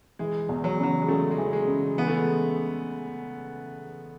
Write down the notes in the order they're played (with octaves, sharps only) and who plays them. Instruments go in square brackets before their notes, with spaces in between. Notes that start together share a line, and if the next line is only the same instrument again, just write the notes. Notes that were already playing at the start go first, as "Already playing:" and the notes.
[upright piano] E3 [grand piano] G#3
[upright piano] E2
[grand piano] F#3
[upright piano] C#3 [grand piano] F#3
[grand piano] G#3
[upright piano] C#3 [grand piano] A3
[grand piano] G#3
[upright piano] E3
[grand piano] G#3
[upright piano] C#3
[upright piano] E3 [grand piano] B3
[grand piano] A3
G#3